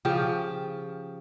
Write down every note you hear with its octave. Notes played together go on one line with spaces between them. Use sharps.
C#3 F3 G4